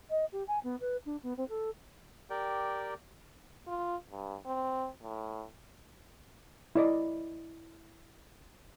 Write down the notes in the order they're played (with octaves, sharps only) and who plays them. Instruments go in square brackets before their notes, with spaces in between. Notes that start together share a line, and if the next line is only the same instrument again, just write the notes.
[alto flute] D#5
G4
G#5
B3
B4
D4
B3
C4
A4
[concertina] G4 A#4 D5 G5
[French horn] F4
G2
C4
A2
[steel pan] E4 D5 D#5